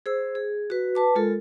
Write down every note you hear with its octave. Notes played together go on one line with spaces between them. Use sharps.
G#4 C5 E6
G#4
F#4 B4
B4 A5 D6
G#3 F4 A4 A#4